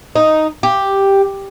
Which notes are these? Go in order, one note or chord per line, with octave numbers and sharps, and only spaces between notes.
D#4
G4